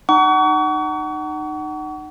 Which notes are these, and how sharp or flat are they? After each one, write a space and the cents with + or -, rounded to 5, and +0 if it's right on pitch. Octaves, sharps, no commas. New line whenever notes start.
D#4 -30 F#5 +30 C#6 +35